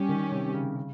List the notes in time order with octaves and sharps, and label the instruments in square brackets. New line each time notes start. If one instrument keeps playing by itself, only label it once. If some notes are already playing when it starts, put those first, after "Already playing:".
Already playing: [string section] G3 C#4 G4
[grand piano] D#3
C3
C#3
C#3